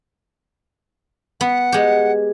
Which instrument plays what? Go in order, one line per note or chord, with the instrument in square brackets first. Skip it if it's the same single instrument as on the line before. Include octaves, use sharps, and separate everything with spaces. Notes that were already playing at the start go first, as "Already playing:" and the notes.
[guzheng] B3 [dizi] F#5
[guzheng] G#3 G4